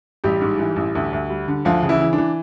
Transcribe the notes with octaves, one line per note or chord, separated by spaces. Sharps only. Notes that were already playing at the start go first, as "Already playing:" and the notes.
A1 G3 G4
G#2
E3
A1
D2
D2
G3
D3
D2 F3 F4
C#3
E3 E4
E3
D4
E3